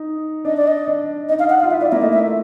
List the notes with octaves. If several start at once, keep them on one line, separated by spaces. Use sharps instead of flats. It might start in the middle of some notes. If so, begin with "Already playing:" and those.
Already playing: D#4
D4 D#5
D5
D#5
D4
D#4 D#5
F5
F#5
F5
F4
E4 E5
E4 D5
A#3 E5
A3 D#5
A3 E5